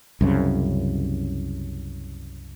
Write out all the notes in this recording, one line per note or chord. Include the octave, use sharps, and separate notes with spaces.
C2 F#2 C#3